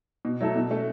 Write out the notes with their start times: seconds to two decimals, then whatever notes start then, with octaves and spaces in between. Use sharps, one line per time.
0.25 B2
0.41 F#3 A3 E4 A4
0.56 B2
0.71 A3 C#4